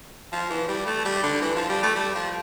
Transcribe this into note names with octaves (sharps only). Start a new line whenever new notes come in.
F3
E3
G3
A3
G3
D3
E3
F3
G3
A3
G3
F3